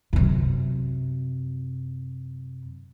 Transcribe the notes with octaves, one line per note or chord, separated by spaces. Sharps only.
F#2 C3